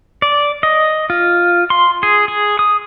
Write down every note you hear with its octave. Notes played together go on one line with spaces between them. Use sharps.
D5
D#5
F4
C6
G#4
G#4
D#6